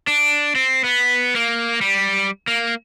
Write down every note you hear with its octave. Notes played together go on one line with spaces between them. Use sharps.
D4
C4
B3
A#3
G3
A#3